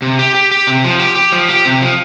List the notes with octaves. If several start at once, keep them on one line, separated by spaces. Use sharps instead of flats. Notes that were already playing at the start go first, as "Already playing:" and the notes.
C3
G4
G4
G4
C3
F3
G4
G4
F3
G4
C3
F3